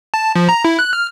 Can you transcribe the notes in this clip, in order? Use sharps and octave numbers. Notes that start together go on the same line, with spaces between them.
A5
F3
A#5
E4
F#6
F6